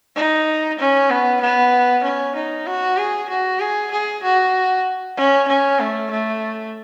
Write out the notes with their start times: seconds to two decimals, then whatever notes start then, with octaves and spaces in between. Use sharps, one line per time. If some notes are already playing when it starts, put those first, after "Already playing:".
0.16 D#4
0.79 C#4
1.11 B3
1.41 B3
2.04 C#4
2.36 D#4
2.67 F#4
2.97 G#4
3.29 F#4
3.60 G#4
3.91 G#4
4.23 F#4
5.17 C#4
5.48 C#4
5.80 A3
6.11 A3